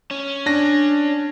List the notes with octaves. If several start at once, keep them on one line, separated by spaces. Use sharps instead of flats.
C#4
D4 A#6